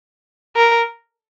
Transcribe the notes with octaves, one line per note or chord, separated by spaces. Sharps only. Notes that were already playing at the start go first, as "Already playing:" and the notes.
A#4